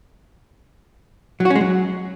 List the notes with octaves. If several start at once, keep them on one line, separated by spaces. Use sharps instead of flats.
F#3
F#4
C#4
G#3
F#3